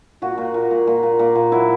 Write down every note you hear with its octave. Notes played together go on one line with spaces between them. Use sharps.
A#2 F#4
A#2
A#2
A#2
A#2
A#2
A#2
A#2
F#3 E4